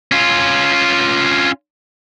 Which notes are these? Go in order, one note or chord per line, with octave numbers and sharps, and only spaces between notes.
C#4 F4